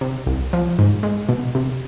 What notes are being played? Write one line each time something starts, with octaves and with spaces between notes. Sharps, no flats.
C3
C2
F3
G#2
G#3
B2
C3